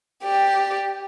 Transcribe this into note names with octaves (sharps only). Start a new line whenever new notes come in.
G4 D5